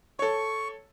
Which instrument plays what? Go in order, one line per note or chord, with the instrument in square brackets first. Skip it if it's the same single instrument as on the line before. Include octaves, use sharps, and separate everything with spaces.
[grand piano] A4 C#5 [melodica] C#6